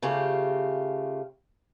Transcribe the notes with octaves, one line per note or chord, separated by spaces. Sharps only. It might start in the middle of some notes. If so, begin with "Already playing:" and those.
C#3 A3 F4 G4